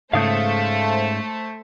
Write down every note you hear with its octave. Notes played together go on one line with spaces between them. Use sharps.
G#2 C#3 A3 C5 F5 D#6 G6